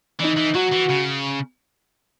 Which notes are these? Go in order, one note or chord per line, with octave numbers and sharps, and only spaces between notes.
E3 D#4
E3
F#3 F#4
E3
C#3